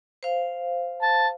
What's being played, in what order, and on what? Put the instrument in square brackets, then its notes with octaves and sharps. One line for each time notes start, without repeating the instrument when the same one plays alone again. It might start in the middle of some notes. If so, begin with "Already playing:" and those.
[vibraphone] C5 F5
[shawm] A5